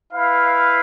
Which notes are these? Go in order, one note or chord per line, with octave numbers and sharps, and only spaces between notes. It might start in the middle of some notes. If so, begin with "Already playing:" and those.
E4 B4 F5